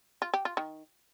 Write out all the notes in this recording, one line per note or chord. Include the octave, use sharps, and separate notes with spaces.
F4
G4
F4
D#3